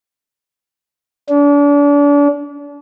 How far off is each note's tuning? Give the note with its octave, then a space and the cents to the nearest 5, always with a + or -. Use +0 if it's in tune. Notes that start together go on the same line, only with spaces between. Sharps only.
D4 -35